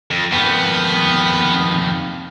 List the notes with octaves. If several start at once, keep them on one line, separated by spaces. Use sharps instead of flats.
F2
F2 D#3 B3